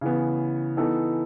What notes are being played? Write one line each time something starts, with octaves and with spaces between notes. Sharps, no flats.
C#3 E3 B3
E3 B3 D#4 A4